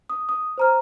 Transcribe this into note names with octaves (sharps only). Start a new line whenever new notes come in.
D#6
D#6
C5 A#5 F6